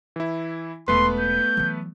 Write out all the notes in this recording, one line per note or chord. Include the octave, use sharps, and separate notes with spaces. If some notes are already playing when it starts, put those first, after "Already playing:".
E3 E4
E1 A3 B3 C#4 B4 C6
G6
E3 F#3